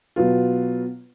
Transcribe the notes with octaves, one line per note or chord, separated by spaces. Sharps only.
B2 F#3 B3 F4